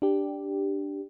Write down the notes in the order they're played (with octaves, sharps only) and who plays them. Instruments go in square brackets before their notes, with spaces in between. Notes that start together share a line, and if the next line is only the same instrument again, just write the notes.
[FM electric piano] D4 G4